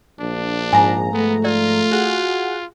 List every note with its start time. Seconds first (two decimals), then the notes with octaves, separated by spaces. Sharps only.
0.20 A#1 D4
0.73 G#2 F3 G#5 A#5
1.13 A3 B3
1.44 F4 D5
1.91 F#4 G#4 F#5